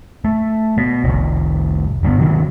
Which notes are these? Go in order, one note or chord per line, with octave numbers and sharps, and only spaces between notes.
A3
B2
F1 C2
G1 G2 A#2 B3
C3 D#3 F#3